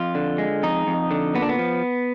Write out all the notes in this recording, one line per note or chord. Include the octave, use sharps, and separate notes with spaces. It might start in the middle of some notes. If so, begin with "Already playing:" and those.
Already playing: F2 F4
D3
G#3
F2 D#4
F2
D3
A#2 B3
D4
B3
F3